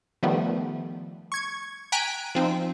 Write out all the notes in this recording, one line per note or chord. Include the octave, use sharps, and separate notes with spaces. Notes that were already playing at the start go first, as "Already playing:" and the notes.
D#3 F3 G3 A3 B3
C#6 G#6
G5 G#5 A#5 F#6 B6 D7
F3 C4 D#4